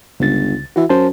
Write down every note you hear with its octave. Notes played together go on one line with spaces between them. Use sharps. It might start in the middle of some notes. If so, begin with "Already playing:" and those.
G1 C#2 A6
E3 F#4 E5
F#2 C5 A5